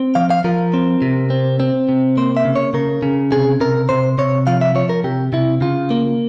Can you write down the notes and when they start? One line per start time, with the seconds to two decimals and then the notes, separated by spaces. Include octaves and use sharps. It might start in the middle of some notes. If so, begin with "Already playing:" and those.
Already playing: C4
0.15 F3 F5
0.30 F5
0.44 F3 A#4
0.74 C4
1.02 C3
1.30 C4
1.60 C4
1.89 C3
2.17 A#3 C5
2.37 E5
2.45 C#3
2.56 C#5
2.74 C#3 A#4
3.02 C#3
3.32 C3 G#4
3.60 C3 A#4
3.89 C3 C5
4.18 C3 C#5
4.47 F3 F5
4.61 E5
4.75 F3 C#5
4.89 A#4
5.04 C3 G4
5.33 C3 E4
5.61 C#3 F4
5.90 A#3